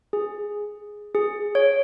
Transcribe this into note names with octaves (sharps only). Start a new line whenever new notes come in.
G#4
G#4
C#5